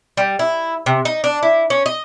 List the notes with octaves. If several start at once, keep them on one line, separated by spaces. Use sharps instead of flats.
G3
E4
C3
D#4
D4
E4
C#4
D#5